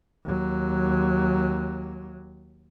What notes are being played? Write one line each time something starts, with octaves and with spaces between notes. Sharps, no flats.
D#2 F#3